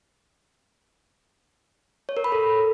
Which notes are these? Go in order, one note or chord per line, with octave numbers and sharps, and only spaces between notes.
C#5
A#4
B5
A4